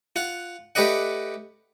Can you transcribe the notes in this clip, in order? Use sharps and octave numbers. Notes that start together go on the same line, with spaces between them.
F4 F#5
A3 G4 B4 D5 D#5 F#5